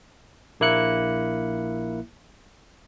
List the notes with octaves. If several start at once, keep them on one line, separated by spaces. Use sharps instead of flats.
A#1 A#3 E4 F#6 C#7